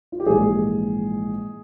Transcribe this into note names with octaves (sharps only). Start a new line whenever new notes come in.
F4
G4
A#1 G#2 E3 G#4